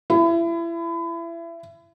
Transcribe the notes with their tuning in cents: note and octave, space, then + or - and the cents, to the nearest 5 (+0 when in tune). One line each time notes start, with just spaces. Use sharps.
E4 +30